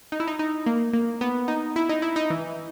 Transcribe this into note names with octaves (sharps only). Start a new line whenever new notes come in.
D#4
E4
D#4
D#4
A#3
A#3
B3
D#4
E4
D#4
E4
D#4
E3